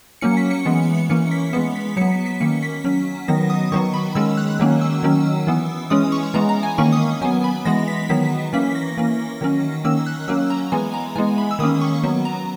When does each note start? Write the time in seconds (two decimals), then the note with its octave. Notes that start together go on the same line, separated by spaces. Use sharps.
0.21 F#3 A#3 C#4 C#7
0.37 B6
0.51 C#7
0.65 E3 G#3 B3
1.10 E3 A#3 C#4 C#7
1.31 B6
1.53 E3 G#3 B3 C#7
1.76 B6
1.97 F#3 B3 C#7
2.11 B6
2.26 B6
2.40 D#3 A#3 C#4 C#7
2.63 B6
2.84 F#3 C#4
3.28 D#3 F#3 B3 A#6
3.50 D#6
3.72 D#3 F#3 B3 C#6
3.94 B5
4.15 D#3 G#3 C#4 E6
4.37 F#6
4.59 D#3 F#3 A#3 C#4
4.81 E6
5.03 D#3 F#3 C#4
5.47 E3 B3
5.90 E3 G#3 C#4 D#6
6.12 C#6
6.34 E3 G#3 B3 A#5
6.49 A#5
6.63 G#5
6.78 D#3 A#3 C#4 C#6
6.92 D#6
7.21 F#3 B3 G#5
7.44 B5
7.65 E3 G#3 B3 A#6
7.88 B6
8.09 D#3 F#3 B3 B6
8.53 E3 A#3 C#4 B6
8.75 A#6
8.97 E3 A#3 C#4
9.41 D#3 F#3 C#4
9.84 D#3 A#3 C#4 E6
10.06 F#6
10.28 F#3 A#3 C#4 E6
10.50 A#5
10.72 E3 G#3 B3 G#5
10.94 A#5
11.15 E3 G#3 B3 G#5
11.38 B5
11.51 E6
11.59 D#3 A#3 C#4 D#6
11.81 C#6
12.03 F#3 B3
12.25 A#5